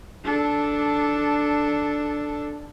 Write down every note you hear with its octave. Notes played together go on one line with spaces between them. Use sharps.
D4 A4